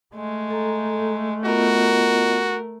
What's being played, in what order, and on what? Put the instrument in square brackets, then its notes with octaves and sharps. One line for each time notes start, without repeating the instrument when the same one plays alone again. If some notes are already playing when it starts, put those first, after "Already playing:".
[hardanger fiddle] G#3 [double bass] A3
[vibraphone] A4 A#5
[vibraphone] B3 F4 D#5 [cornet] F#4 [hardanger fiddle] A#4